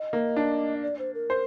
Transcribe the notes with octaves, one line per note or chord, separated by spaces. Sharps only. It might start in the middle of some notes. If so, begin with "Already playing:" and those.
Already playing: D#5
A#3
D4
D5
C5
A#4
C5